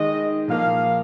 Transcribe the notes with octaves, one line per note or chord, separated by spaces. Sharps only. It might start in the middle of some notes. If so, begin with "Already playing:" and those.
Already playing: D#3 G#3 D#4 D#5
A#2 F3 A#3 F5